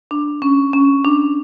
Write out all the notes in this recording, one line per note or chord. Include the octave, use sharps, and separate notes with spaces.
D4
C#4
C#4
D4